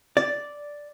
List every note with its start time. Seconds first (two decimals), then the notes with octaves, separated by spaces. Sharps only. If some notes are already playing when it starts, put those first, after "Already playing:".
0.17 D5